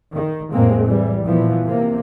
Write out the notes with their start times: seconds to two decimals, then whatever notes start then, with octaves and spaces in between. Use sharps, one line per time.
0.13 D#3
0.52 F1 A2 G#3 A#3 C4
0.85 E3 G3
1.25 A#2 E3 F3 B3
1.65 C3 A#3